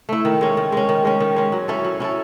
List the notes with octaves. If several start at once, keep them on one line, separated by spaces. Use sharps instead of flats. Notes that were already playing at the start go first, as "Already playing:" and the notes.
A3 E4
D#3
G#3 C#4
D#3
G#3 C#4
D#3
G#3 C#4
D#3
G#3 C#4
F#3
C#4 E4 A4
F#3
C#4 E4 A4